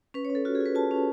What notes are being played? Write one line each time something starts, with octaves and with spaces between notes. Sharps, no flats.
C#4 B4
C#5
C#4
A4
F4 F#4
G#4
F4
B4
F4 A5
C#4